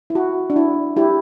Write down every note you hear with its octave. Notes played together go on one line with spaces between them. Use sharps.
E4
F#4
D4
E4
E4 G4